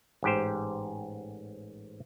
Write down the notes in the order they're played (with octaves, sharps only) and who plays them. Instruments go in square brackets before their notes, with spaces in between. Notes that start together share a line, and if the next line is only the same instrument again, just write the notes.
[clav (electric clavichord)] A1 G#2 G4 C5